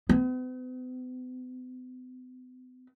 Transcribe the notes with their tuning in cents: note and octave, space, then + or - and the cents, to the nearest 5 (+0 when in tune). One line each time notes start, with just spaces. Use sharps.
B3 +45